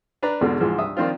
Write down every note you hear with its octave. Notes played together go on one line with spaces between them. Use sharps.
D4 B4 D5 A#5
E2 G#2 B2 D3
C2 G#2 E3 F3
G2 E5 D#6
D#3 F3 C4 D4 F4